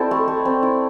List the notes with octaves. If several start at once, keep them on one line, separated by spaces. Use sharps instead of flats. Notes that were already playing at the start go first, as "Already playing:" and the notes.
Already playing: C4 E4 A4 D5 E5
A3
A3
C4
E4